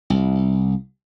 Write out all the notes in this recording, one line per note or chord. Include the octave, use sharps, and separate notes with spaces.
C2